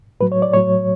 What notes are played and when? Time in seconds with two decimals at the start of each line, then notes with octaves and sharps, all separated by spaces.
0.20 A2 F#3 B4
0.32 C#5
0.42 D5
0.53 A2 F#3 C#5